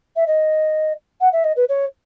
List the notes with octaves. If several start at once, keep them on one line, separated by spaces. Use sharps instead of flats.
E5
D#5
F#5
E5
D#5
B4
C#5